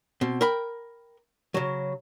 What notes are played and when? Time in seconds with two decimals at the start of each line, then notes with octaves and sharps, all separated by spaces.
0.21 B2 C4
0.41 A#4 G5 B5
1.54 C#3 F#3